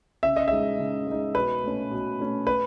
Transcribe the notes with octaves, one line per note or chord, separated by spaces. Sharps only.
C#3 E5
D#5
G#3 D#4 E5
C#3
G#3 D#4
B2 B4
A3 C#4
B2
A3 C#4
B4